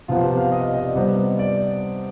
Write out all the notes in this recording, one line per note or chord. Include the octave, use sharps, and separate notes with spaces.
C3 F3 B3 F4
G4
F5
D#5
F5
D#5
D5
C3 G3 B3 C5
D5